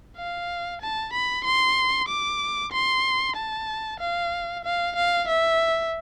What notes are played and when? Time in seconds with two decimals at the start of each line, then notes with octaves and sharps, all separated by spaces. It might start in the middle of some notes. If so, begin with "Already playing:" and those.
0.17 F5
0.82 A5
1.13 B5
1.45 C6
2.08 D6
2.72 C6
3.36 A5
4.00 F5
4.65 F5
4.96 F5
5.28 E5